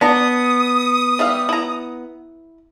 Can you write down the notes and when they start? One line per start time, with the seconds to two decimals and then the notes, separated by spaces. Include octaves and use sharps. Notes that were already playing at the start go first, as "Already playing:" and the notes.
0.01 B3 D4 A#5 D#6
1.19 G3 E5 F5
1.49 E4 A#5